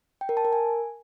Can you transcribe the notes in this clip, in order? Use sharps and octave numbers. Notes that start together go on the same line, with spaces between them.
G5
A#4
A5
A#4
G#5